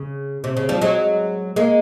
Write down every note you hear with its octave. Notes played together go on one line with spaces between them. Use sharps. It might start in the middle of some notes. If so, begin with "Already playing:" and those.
Already playing: C#3
C3
C#3
F3 G3
F#3 G#3
G#3 A#3